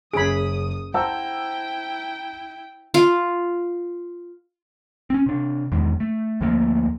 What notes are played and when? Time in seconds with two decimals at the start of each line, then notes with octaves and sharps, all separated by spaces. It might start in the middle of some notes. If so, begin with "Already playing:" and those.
0.14 F#1 C#4 G#4 B5 D#6 D7
0.94 E4 C5 F#5 G5 A5 A#5 E6 G6
2.94 F4
5.10 C4 C#4
5.26 C3 D4
5.72 E1 E2 G#2 D#3
6.00 A3
6.41 D2 F3 A3 A#3